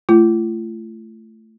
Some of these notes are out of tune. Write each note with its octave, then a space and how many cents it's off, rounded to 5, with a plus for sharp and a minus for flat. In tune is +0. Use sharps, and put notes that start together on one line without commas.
A3 +0 F4 -40